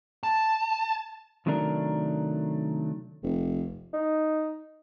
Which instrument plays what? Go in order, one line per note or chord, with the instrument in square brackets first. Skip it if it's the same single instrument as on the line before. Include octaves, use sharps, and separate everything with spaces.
[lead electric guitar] A5
[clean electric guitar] C3 D#3 F#3 A3 D4 A#4
[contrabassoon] F1
[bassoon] D#4